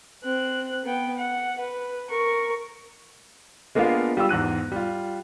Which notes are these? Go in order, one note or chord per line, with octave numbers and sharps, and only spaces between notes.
C4 F#6
B3 G5
F#5
B4
A#4 C#6
G#3 A#3 B3 D4 F4 F5
G3 F4 G4 E6
E2 G#2 F#6 D#7
G3 F4